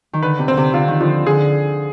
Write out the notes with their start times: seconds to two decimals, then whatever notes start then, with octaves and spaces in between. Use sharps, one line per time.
0.13 D#3
0.23 D3 B4
0.39 C3
0.48 D3 C4
0.57 C3
0.74 D3 F4
0.88 D#3
1.00 D3 F3
1.26 D3 G#4